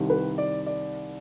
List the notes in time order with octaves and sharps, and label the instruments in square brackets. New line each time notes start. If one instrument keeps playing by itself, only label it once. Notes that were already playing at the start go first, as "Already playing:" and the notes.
Already playing: [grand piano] C2 C3 D#3 G3
B4
D5
D5